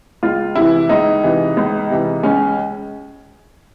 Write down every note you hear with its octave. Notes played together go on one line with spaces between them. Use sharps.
C#2 F4
C3 E4
E3
C#2 D#4
C3 E3
C#2
C3 E3
C#2 C#4